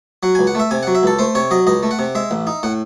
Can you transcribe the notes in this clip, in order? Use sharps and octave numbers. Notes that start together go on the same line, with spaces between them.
F#3 F#5
C#2 G#5
F#5
A3 E5
C3 G#5
F#3 F#5
E5
C#2 A4
A3 C5
C3 C#5
F#3 D#5
C#2 D#5
A3
F#5
C3
G#3 E5
A1
D#4
A2 F#5